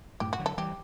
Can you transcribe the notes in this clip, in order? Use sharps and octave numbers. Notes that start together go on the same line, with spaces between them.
F#2 A2 G4
F#4
D3 F#3
A4
E3 G3 G4